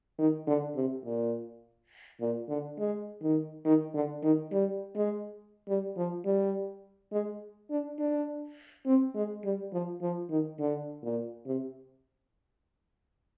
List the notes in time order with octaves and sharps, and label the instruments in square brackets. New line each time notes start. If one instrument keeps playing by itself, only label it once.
[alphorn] D#3
D3
C3
A#2
A#2
D3
G#3
D#3
D#3
D3
D#3
G3
G#3
G3
F3
G3
G#3
D4
D4
C4
G#3
G3
F3
F3
D#3
D3
A#2
C3